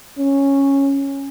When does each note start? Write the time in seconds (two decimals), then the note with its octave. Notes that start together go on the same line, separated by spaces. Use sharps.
0.18 C#4